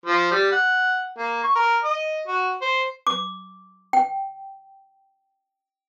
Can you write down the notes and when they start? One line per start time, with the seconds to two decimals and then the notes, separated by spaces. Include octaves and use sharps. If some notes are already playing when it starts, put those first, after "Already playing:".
0.06 F3
0.31 G3
0.52 F#5
1.18 A#3
1.44 C#6
1.55 A#4
1.84 D#5
2.27 F#4
2.62 C5
3.07 D6
3.93 G5